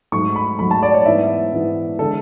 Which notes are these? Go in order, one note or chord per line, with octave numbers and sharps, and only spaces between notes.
G#2 F#3 A3 C#6
B5
G#2 F#3 A3 B5
A5
D5
C#5
G#2 E3 B3 E5
G#2 E3 B3
D3 G#3 A4